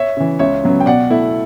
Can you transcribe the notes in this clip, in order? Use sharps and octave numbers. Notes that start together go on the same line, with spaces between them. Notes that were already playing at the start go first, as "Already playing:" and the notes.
Already playing: C#5 E5
C#3 E3
C#2 C#5 E5
C#3 F#3 B3
G5
B2 D5 F#5
A3 E4